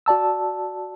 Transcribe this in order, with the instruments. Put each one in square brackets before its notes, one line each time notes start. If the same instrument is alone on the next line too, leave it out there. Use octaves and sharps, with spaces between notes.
[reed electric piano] F#4 D5 A5 E6